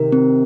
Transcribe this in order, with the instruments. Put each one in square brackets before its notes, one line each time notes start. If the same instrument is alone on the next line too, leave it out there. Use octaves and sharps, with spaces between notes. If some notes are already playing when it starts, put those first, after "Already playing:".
Already playing: [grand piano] C3 D#3 [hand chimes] A#4
[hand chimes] C4